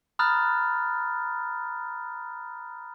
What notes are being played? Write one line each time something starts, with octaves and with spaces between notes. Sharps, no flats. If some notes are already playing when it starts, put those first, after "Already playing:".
A#5 B5 D#6 F6 F#6 A6